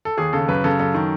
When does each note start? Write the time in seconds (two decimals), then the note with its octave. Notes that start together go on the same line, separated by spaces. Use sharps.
0.05 A4
0.17 D#2 G#4
0.33 C#3 A4
0.48 F#2 B4
0.64 C#3 A4
0.80 F#2 A4
0.95 D#3